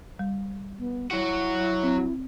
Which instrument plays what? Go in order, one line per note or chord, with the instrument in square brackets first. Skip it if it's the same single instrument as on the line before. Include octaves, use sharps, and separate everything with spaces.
[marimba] G3
[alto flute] B3
[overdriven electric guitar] F#3 F#4 [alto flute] E4
[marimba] C4